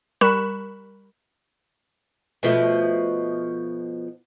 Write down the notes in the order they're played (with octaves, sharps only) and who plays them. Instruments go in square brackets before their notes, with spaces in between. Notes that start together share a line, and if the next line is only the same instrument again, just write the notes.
[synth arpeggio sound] G3 A#4 B5 C#6 F#6 E7
[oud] B2 F3 A3